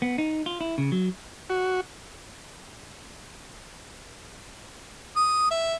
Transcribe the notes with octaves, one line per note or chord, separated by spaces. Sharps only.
B3
D#4
F4
E4
C#3
F#3
F#4
D#6
E5